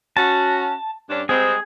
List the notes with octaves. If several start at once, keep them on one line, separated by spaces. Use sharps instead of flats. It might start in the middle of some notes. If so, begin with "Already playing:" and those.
C#4 F#4 A5
G2 C#4 D4
G3 G#3 C4 G#4